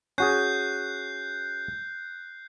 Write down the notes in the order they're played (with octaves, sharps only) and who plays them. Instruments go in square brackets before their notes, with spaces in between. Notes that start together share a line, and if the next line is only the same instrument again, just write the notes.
[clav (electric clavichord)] C#4 F#4 G#4 [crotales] F#6 G6 C7